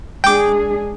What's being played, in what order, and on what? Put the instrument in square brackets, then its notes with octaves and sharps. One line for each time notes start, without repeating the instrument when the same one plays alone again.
[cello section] G#3 D4 G#4 [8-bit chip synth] G5 D6